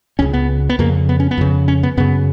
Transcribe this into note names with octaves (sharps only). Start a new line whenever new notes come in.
C#2 C#3 C#4
B3
B3
F2 C#3 A#3
B3
C#4
B3
F2 C#3
C#4
B3
F#2 C#3 B3